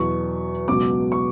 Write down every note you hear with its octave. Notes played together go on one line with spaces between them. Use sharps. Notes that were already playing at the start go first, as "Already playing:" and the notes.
Already playing: E2 B2 F#3 B3 C#6
C#2 B2 F#3 B3 D6
C#6